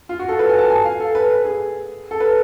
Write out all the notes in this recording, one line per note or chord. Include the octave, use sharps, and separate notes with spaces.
F4
F#4
A4
B4
G#5
A5
G#5
F5
A4
B4
G#4
A4
B4